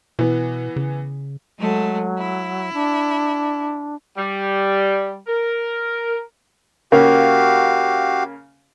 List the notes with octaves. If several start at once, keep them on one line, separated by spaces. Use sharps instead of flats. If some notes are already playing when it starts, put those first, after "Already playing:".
B2 E3 B3
C#3
F#3 G#3 A3
E4
D4
G3
A#4
C#3 A#3 F#4 G4 F5